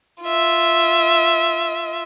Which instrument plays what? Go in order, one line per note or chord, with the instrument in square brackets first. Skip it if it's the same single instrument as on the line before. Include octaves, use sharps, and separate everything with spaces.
[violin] F4 E5